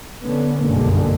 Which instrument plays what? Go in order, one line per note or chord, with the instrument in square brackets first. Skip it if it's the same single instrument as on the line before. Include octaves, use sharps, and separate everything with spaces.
[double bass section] D3 B3 C#4
F#1 B1 G2 D3 G#3 A#3